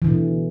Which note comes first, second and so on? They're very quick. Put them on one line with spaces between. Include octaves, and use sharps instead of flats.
E3 D3 B2